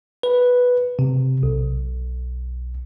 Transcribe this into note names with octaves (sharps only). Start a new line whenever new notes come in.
B4
C3
B1